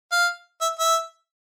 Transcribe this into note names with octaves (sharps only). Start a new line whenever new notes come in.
F5
E5
E5